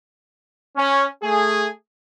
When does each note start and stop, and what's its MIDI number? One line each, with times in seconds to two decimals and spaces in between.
0.76 1.05 61
1.22 1.69 57
1.22 1.69 68